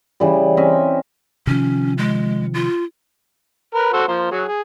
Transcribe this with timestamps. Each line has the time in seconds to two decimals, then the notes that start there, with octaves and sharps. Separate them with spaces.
0.20 C#3 E3 G3
0.57 C4 C#4 D#5 E5
1.47 C3 D#3 F3 C#4
1.98 G#3
2.54 F4
3.75 A#4 B4
3.93 F#4 A4 C5
4.08 F3 A#3 C5
4.31 F#3 F#4 G#4
4.48 G#4